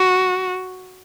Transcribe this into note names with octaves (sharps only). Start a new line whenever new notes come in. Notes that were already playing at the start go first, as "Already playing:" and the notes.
Already playing: F#4